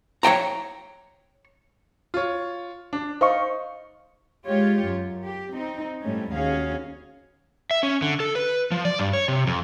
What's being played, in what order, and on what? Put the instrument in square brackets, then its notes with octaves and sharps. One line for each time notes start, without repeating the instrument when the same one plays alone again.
[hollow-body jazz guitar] C#5 D#5 G5 A#5
[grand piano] F4 C#5
D4
[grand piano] D#4 [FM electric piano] C5 F5 C#6
[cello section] G#3 F4 G4 C#5
F#2
G4
C4 D#4
A2 F3 G3 A3 C#4
D#2 C#4 F#4 G#4 F5
[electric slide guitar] E5
C#4
D3
A4
B4
F3
D5
G2
C#5
C3
F2